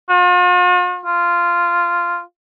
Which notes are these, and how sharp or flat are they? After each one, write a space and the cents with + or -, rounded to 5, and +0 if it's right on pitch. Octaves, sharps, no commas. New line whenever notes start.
F4 +45
F4 -10